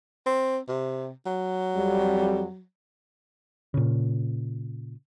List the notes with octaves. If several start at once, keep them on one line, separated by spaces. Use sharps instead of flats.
C4
C3
F#3
F2 G3
A#2 C#3